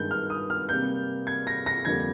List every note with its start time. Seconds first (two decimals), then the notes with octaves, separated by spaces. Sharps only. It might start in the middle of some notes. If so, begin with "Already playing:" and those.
Already playing: G2 D#3 G#3 G6
0.11 F6
0.30 D#6
0.50 F6
0.69 C3 G3 A#3 G6
1.27 G#6
1.47 A#6
1.66 A#6
1.85 F2 D3 G3 A#3 G#6